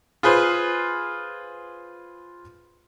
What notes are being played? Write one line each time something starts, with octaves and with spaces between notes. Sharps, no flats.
F4 G#4 B4 C5 C6